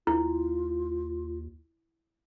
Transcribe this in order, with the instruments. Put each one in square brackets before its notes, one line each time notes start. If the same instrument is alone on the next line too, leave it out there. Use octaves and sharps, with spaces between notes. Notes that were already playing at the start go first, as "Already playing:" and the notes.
[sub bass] D#2 [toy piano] E4 [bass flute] F4